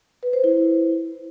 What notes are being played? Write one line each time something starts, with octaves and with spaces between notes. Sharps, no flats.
B4
C5
E4